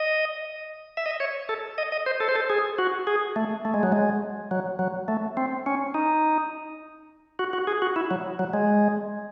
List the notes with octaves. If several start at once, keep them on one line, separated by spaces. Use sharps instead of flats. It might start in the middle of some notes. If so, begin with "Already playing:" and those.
Already playing: D#5
E5
D#5
C#5
A4
D#5
D#5
C5
A4
C5
A4
G#4
F#4
G#4
A3
A3
G#3
F#3
G#3
F#3
F#3
A3
C4
C#4
D#4
F#4
F#4
G#4
F#4
E4
F#3
F#3
G#3